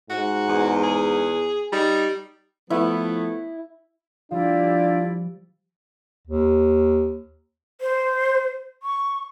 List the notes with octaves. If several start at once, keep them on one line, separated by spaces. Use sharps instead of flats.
G#2 F#4
E2
G#4
G3 D#4
F3 A3 B3 E4
F3 G3 D4 E4 F4 G4 D5
D#2
C5
C#6